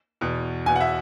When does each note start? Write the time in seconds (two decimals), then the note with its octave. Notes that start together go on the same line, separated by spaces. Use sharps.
0.21 E2 B2
0.66 E2 B2 G#5
0.76 F#5
0.81 E5